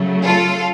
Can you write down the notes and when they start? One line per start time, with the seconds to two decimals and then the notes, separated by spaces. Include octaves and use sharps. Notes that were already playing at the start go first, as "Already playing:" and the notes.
Already playing: C#3 F#3 A3
0.23 F4 A4